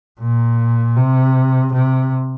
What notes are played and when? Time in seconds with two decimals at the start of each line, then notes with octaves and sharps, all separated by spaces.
0.20 A#2
0.96 C3
1.73 C3